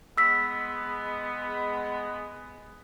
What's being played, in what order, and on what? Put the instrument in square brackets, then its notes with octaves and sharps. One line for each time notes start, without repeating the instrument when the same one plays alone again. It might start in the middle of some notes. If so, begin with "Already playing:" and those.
[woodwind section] G#3 B3 [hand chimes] E6 B6